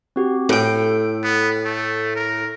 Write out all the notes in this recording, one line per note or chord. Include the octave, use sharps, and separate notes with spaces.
C4 F#4 G4
A2 A4 G5 D7
B3
A3
A#4